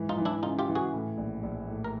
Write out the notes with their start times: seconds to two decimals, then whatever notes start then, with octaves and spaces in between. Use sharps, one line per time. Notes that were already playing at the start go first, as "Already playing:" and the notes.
Already playing: G#2 E3
0.09 D#4 F4
0.18 E3
0.25 D4 E4
0.43 C#3 D#4 F4
0.59 F4 G4
0.68 E3
0.75 F#4 G#4
0.93 A2
1.17 A#1
1.43 A#1
1.68 A2
1.84 A#4